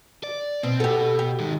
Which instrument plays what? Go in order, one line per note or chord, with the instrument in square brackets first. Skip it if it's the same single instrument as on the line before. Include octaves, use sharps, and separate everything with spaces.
[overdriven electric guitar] D5
[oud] B2 [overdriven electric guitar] C4
[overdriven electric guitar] B2 F#4 [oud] G4 A4
[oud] G4
[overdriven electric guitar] D#3 G#3